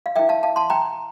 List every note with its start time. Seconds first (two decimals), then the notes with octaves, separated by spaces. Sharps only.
0.06 F5
0.16 E4 A#4 E5 G5
0.29 F5 A5
0.43 F5 A5
0.56 A5 C6
0.70 G5 A#5